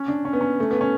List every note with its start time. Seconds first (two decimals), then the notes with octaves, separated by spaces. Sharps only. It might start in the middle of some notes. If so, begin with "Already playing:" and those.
Already playing: C#4
0.08 D4
0.25 C#4
0.33 B3
0.41 C#4
0.60 A3
0.71 B3
0.81 C#4